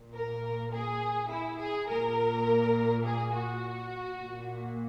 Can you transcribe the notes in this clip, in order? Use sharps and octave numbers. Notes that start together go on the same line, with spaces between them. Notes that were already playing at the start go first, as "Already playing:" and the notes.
Already playing: A#2
A#4
G#4
E4
G#4
A#2 A#4
G#4
F#4
A#2